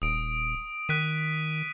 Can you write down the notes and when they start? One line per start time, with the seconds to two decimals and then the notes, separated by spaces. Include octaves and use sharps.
0.02 D#1 D#6 D7
0.89 D#3 F#6 B6 D#7